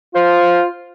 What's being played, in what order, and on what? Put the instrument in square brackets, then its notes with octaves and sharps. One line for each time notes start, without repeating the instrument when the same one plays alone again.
[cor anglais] F4 [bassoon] C5